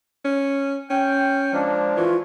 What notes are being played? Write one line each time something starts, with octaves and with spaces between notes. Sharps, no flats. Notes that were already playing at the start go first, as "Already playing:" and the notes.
C#4
C#4 G5
F3 G#3 A#3 D4
E3 F4 F#4 C#5